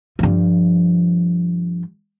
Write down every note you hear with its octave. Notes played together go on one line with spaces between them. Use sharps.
G2 F3